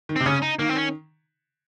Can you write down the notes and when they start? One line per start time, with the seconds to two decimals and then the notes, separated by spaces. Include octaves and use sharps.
0.09 D#3
0.16 C3 C4
0.26 C#3 C#4
0.42 D#4
0.59 D#3 A#3
0.69 C4
0.76 C#4